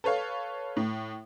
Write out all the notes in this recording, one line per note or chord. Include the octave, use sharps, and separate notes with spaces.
A4 B4 C#5 F5
A2